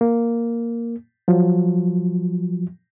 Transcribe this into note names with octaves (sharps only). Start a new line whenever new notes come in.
A#3
F3 F#3